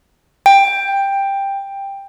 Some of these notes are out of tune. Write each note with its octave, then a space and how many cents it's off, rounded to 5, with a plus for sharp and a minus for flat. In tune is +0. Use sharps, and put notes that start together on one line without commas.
G5 +10